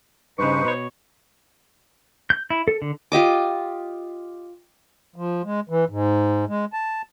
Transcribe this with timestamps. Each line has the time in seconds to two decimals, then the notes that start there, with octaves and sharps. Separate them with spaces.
0.39 G2 C#3 D#4 B4 C5 C#6
0.64 B2 C#5
2.30 G6
2.50 E4
2.68 A4
2.82 D3
3.12 F4 G4 D#5 D6
5.16 F3
5.44 G#3
5.69 E3
5.89 G#2
6.49 G#3
6.73 A5